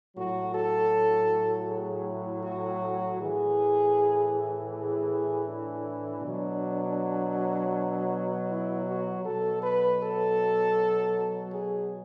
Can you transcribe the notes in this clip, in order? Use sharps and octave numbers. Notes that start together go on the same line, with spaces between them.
A2 F#3 F#4
A4
G#4
E4
F#4
A2 E3 G#4
G#4
D4
B2 F#3
E4
F#4
B2 F#3 A4
B4
A4
G#4